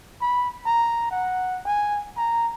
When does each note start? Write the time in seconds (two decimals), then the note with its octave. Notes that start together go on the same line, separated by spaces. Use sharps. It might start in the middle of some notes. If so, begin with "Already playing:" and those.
0.22 B5
0.66 A#5
1.11 F#5
1.65 G#5
2.17 A#5